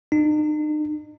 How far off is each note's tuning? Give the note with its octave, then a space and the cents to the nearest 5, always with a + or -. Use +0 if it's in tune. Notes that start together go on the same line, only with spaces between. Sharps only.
D#4 -40